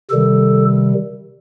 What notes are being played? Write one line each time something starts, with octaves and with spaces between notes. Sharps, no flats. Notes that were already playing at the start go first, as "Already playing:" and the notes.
C3 D#3 G3 A4